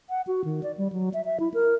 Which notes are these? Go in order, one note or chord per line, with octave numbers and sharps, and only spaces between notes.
F#5
F#4
D#3
D5
G3
F#3
E5
E5
E4
A#4